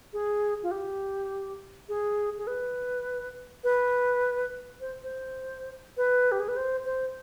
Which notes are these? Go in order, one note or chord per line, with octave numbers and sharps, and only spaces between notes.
G#4
F4
G4
G#4
G#4
B4
B4
C5
C5
B4
G4
G#4
B4
C5
C5